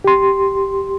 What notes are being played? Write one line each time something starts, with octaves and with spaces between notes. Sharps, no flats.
G4 C6